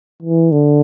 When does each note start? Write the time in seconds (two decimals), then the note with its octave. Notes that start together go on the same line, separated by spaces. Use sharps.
0.23 E3
0.52 D3